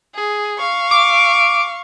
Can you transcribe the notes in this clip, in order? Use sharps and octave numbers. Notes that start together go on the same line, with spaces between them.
G#4
F5 C#6
D6